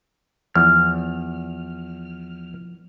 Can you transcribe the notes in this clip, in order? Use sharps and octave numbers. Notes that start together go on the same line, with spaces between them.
E2 F3 F6